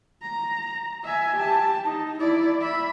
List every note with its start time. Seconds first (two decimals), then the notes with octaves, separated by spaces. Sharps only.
0.23 A#5
1.04 E5 G#5
1.37 G4 A5
1.85 D#4
2.20 E4 D5
2.61 E5 B5